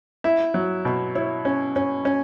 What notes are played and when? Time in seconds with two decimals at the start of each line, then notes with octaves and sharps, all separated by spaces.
0.24 E4 E5
0.54 F#3
0.85 B2
1.15 E4 C#5
1.45 C#4
1.76 C#4
2.05 C#4